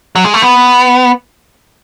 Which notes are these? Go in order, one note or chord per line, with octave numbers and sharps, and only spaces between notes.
F#3
G#3
A3
B3